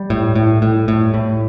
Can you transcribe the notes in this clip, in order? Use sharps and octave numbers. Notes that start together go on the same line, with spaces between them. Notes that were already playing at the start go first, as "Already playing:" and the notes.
Already playing: G3
A2
A2
A2
A2
A2